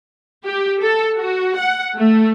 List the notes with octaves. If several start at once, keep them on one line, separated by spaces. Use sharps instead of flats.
G4
A4
F#4
F#5
A3